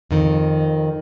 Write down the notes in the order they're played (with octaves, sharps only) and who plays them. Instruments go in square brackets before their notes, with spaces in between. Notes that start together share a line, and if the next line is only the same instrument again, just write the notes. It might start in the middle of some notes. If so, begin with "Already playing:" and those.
[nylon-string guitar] F2 D#3